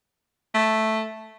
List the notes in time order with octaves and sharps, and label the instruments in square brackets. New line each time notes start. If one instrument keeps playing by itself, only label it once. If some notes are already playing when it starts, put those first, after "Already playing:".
[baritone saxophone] A3